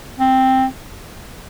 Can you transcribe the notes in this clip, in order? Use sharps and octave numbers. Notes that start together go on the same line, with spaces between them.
C4